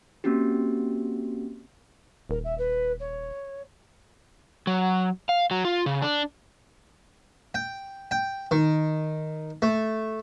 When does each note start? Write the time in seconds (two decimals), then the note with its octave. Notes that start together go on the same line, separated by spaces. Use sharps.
0.24 A#3 C4 C#4 F#4 G4
2.29 D#1 A#4
2.44 E5
2.58 B4
2.99 C#5
4.67 F#3
5.29 F5
5.51 F#3
5.65 F4
5.86 C#3
6.02 D4
7.54 G5
8.11 G5
8.51 D#3
9.62 A3